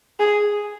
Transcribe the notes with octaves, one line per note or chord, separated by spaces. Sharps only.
G#4